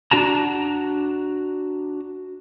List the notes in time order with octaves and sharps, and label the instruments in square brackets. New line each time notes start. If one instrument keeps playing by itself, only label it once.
[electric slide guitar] D4 F#4 A5 A#5